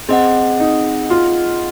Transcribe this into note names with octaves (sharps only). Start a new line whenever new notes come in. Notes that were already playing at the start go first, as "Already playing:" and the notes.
C4 G#4 D#5 F#5
D#4
F4